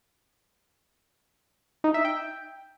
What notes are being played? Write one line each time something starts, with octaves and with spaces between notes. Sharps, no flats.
D#4
E5
G5